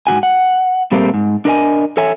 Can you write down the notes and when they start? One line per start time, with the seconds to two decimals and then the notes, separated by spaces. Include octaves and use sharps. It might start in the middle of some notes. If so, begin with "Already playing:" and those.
0.07 G#2 C3 F#4 G#5
0.23 F#5
0.92 A#2 G3 A3 A#3 C4
1.14 G#2
1.45 D4 A#4 D#5 G#5
1.97 A4 C#5 E5 G#5